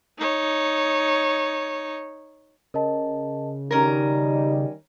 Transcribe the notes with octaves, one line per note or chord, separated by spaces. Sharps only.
D#4 C#5
C#3 A#4 D#5 A5
D#3 G3 C#4 D#4 A#4 A#5